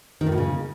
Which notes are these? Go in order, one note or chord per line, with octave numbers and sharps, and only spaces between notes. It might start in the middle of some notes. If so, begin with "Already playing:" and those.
D#3
A2
B2
C#3